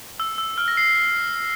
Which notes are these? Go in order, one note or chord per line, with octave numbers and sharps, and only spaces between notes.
E6
E6
F6
A#6
C7